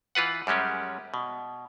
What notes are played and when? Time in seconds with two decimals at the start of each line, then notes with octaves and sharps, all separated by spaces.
0.15 E3 F4 B4 F#5
0.47 F#2 G3 G#3 C#4 G4
1.14 B2